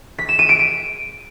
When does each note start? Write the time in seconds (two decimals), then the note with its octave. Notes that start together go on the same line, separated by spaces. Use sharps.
0.19 B6
0.29 E7
0.39 D#7
0.49 D7
0.59 D#7